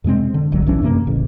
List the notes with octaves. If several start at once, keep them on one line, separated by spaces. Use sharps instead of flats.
F2 C3 G#3 C4
D3
D1 A#1 G2 F#3
B1 E3 C#4 D4
F#2 C3 A#3
D1 A1 C#3